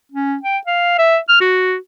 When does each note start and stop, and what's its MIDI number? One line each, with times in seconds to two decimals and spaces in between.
0.12 0.36 61
0.43 0.58 79
0.67 0.94 77
0.98 1.18 76
1.29 1.40 89
1.40 1.76 66